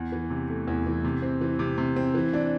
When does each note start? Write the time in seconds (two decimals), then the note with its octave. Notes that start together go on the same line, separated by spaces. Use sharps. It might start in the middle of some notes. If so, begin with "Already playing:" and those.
Already playing: E2
0.12 E3
0.30 C3
0.49 A3
0.68 E2
0.86 E3
1.04 C3
1.22 C4
1.41 E3
1.59 C3
1.78 C3
1.96 C4
2.14 E3
2.33 D4